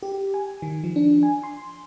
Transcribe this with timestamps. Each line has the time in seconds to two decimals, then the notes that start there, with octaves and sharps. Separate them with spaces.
0.03 G4
0.34 G#5
0.62 D#3
0.84 F3
0.96 D4
1.23 G#5
1.43 C6